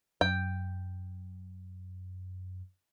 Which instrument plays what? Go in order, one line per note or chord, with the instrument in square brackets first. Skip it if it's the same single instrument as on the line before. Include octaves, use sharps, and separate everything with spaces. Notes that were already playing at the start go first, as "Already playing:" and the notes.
[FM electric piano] F#2 [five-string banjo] G5